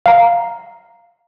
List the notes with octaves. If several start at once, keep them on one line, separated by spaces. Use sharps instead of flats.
F5 A#5